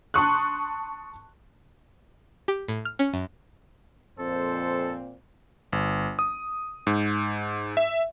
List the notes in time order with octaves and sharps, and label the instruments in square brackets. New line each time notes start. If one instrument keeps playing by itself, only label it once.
[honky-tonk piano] A5 C6 C#6 D#6 F#6
[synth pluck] G4
A2
F6
C#4
F#2
[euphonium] F2 [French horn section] A#2 C4 [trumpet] A4 [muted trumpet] C5
[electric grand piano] G1
D#6
G#2
E5